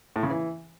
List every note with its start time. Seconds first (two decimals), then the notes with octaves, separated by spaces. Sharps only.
0.16 A2
0.23 C#3
0.30 E3